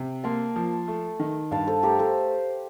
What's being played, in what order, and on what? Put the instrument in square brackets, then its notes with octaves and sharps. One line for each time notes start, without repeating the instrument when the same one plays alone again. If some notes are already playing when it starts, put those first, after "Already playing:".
Already playing: [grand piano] C3
[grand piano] A#3 [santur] A5 C6
[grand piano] F3
A3
D#3
[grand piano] G2 [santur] F5 A5
[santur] A4 C5
[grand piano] A3 [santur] G4 A#4
[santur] A4 C5